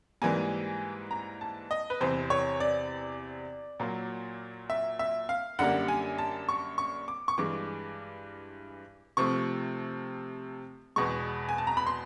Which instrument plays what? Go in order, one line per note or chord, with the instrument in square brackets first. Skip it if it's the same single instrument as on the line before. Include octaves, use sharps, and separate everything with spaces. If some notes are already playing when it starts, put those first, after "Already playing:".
[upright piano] G#2 E3 G3 A#3 G#5
A#5
A5
D#5
B4
E2 C3 E3 C5
C#5
D5
A#2 F#3 A#3
E5
E5
F5
F#2 D3 G3 A#3 F#5
G#5
A5
C#6
C#6
D6
C#6
G2 E3 G#3 D6
C3 F3 A3 C#6
E2 B2 G#3 C#6
G#5
A5
A#5
B5
C6